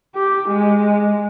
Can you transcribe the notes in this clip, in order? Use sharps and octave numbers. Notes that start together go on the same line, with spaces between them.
G4
G#3